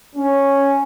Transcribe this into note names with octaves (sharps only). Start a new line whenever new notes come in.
C#4